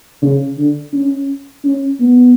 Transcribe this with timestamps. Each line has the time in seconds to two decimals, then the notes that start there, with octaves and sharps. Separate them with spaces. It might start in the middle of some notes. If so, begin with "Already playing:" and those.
0.22 C#3
0.57 D3
0.93 C#4
1.64 C#4
2.00 B3